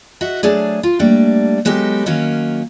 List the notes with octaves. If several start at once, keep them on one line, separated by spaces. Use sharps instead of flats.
F#4 D#5 E5
F#3 A3 D4 G#4
F4
G3 A3 A#3 D4
F#3 G#3 B3 D#4 G4 A4
D#3 F#3 A#3 C#4